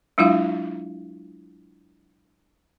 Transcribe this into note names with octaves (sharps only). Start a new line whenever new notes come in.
F#3 G#3 D4 E4 F4 F5